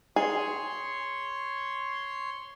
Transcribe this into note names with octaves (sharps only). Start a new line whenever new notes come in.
G#4 C#5 C6